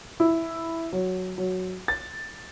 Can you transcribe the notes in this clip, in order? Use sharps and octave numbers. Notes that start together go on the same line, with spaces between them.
E4
F#3
F#3
A6